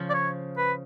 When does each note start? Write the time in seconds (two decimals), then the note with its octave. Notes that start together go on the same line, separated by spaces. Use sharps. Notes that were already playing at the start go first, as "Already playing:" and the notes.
Already playing: C#3 F3
0.10 D5
0.14 C#5
0.58 B4